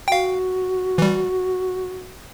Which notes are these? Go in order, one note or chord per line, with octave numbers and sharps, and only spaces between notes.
F#4 F5 G5
E3 G3